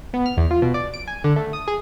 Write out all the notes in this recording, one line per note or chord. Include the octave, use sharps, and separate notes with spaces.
B3
F6
E2
F4
B2
D5
D7
G#5
D3
A3
D#6
G#4